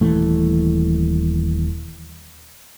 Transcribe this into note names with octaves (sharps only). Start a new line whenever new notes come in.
D#1 E3 A3